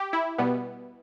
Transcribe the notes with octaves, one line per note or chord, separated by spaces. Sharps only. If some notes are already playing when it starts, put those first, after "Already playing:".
Already playing: G4
E4
B2 G3 B3